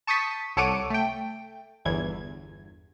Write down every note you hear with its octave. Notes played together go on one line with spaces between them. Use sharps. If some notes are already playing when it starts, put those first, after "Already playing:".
A5 C#6 D#6 G6 A6 B6
C2 A4 C#5 F#5 D6 D#7
A3 G5
G1 E2 G#6